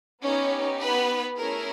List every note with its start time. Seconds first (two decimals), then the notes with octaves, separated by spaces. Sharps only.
0.24 B3 C#4 D#4 G4 C#5
0.81 B3 B4
1.39 A3 C#4 E4 G#4 A#4